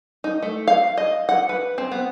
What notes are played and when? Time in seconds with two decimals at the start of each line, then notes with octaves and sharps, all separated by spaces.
0.24 D#4
0.43 A3
0.67 F5
0.97 D#5
1.29 F#5
1.49 B4
1.78 C4
1.91 B3